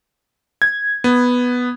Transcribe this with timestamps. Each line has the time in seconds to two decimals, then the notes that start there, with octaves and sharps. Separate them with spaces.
0.62 G#6
1.04 B3